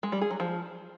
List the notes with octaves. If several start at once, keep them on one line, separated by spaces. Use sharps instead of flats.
G#3
G3
G#4
F#3
F3